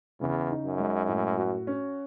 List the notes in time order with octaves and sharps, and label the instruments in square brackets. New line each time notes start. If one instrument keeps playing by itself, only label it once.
[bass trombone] E2 [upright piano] C#3
[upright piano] D#4
[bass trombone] F#2
[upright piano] G#3
A2
F#4
C#4